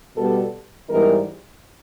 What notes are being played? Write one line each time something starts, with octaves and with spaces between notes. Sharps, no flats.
B2 G3 B3 A4
G#2 E3 G3 B3 D#4 A#4